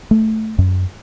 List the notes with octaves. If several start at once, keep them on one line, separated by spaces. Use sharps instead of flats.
A3
F#2